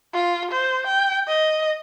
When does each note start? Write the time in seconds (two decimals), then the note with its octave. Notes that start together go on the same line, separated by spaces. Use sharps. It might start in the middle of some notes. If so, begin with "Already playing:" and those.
0.14 F4
0.52 C5
0.87 G5
1.28 D#5